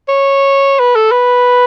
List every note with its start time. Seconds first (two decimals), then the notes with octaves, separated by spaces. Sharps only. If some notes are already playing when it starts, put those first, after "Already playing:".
0.09 C#5
0.80 B4
0.96 A4
1.12 B4